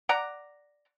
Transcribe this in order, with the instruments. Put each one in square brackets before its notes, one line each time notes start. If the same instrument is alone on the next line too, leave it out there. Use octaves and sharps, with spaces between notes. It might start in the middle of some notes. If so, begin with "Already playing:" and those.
[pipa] D5 F#5 A#5